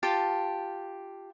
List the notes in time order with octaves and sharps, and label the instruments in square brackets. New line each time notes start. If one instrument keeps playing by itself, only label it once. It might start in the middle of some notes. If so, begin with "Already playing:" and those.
[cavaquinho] F4 G4 A5